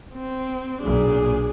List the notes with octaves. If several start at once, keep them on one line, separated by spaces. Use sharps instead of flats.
C4
B1 A#2 D4 G#4